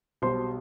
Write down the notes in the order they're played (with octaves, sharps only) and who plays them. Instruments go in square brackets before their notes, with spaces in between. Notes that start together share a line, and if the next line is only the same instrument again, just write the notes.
[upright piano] B1 B2 G3 C5 C6